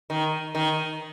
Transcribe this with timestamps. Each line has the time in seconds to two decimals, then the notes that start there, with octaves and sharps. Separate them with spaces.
0.10 D#3
0.55 D#3